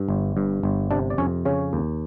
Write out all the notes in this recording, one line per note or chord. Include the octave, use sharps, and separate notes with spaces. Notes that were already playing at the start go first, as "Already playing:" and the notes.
Already playing: G2
G1
G2
G1
C3 D4 D5
D5
F2 C#4 C#5
C#3 C#4 C#5
D#2